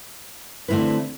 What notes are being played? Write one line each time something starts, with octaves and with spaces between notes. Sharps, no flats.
D3 A3 C4 E4 B4